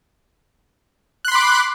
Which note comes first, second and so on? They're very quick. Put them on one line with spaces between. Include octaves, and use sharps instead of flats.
F#6 C6 B5 D6